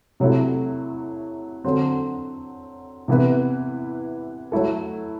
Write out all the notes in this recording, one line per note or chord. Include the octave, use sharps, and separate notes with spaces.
C3 F#3 A3 E4
D3 F#3 C4
C3 E3 B3 E4 B4
F#3 A3 E4 A4